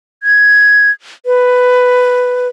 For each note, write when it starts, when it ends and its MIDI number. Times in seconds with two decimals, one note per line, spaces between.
0.23 0.90 92
1.26 2.48 71